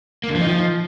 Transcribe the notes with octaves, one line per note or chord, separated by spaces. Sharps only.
A#3
D3
F3
D#4
F3